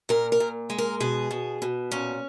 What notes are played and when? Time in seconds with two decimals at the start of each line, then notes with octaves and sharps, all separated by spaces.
0.09 A#2 A#4
0.32 A#4
0.40 A#2
0.70 G#3
0.78 A#4
1.00 B2 G#4
1.31 B2
1.62 B2
1.91 A#2 C#4